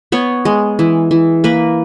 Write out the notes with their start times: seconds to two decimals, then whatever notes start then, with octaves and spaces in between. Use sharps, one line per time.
0.12 B3 C#5
0.45 G#3
0.79 E3
1.11 E3
1.44 A#3 B4